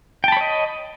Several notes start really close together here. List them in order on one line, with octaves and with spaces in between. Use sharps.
G5 A5 B5 C#5 D#5